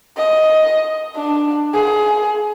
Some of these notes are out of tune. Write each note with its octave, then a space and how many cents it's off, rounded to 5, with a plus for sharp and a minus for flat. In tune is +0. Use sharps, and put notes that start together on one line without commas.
D#5 +10
D4 +10
G#4 +20